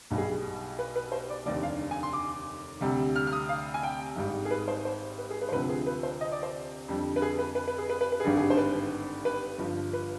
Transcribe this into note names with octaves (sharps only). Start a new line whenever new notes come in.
B1 B2 G3
G#4
B4
B4
C5
D5
F1 D#2 D3 D5
F5
G#5
C6
D6
D2 C3 G3
F6
F6
D#6
F5
G#5
G5
G#1 G#2 G3
G#4
B4
C5
C5
B4
G#4
B4
C5
D2 C3 F3 B4
G#4
B4
C5
D#5
D5
C5
F2 D3 G3
B4
G#4
B4
B4
B4
G#4
B4
B4
B4
G#4
G#1 G2 D3 G3
G#4
C5
B4
B4
G1 G2 F3
B4